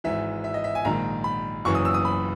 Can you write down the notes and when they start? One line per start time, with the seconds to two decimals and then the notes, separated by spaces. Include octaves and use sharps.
0.04 G#1 G#2 E3 E5
0.44 E5
0.54 D#5
0.64 E5
0.75 G#5
0.85 A#1 G#2 D#3 A#5
1.24 B5
1.65 F#1 F#2 E3 C#6
1.75 D#6
1.85 E6
1.94 D#6
2.05 B5